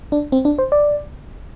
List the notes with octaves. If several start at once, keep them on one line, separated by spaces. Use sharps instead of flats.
D4
C4
D4
C5
D5